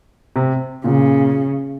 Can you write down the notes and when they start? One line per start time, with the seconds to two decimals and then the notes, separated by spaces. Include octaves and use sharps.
0.36 C3
0.84 A#2 C#3